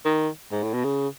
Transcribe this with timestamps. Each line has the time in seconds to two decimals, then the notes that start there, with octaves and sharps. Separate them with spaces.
0.05 D#3
0.52 G#2
0.63 A2
0.73 B2
0.84 C#3